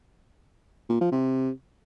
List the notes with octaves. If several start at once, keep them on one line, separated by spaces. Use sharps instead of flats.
A#2
F3
C3